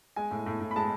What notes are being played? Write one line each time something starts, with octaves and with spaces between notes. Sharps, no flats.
G#3 G#5
A2
A2
A2
B5
G#3 A5